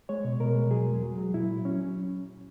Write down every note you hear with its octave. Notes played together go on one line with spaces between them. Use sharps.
G#3 C#5
B2
B2 A#4
G#3
F#3 G#4
E2
F#3
F#3
A#2 E4
F#3
F#3 C#4